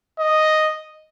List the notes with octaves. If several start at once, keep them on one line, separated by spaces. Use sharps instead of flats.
D#5